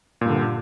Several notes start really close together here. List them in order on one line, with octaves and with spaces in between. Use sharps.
A#2 G2 D3